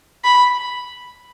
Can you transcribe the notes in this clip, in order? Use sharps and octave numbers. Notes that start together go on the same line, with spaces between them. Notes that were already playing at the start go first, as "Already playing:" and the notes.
B5